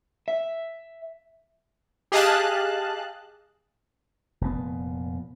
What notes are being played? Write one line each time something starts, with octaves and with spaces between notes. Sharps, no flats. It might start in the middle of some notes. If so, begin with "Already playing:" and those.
E5
G4 G#4 D#5 F5 A5 F#6
F1 A#2 B3